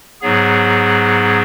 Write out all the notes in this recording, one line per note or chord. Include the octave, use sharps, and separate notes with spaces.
G#2 F#3 B3 G#4